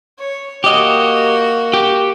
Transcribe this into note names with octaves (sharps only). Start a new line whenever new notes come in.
C#5
A#3 F#4 G4 D#5
G4